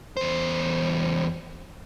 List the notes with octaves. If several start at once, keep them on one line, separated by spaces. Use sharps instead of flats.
E2 C5